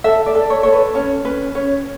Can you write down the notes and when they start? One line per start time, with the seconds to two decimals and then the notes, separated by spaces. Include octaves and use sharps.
0.04 A4 E5
0.26 D5
0.35 A4
0.50 C#5
0.63 A4 C#5
0.73 B4
0.95 C#4 C#5
1.25 C#4 B4
1.55 C#4 C#5